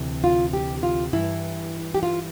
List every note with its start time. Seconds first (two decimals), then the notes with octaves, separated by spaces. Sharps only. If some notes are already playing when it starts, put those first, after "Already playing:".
Already playing: D2 C3 E3
0.24 F4
0.53 G4
0.83 F4
1.13 G2 E3 E4
1.94 G4
2.03 F4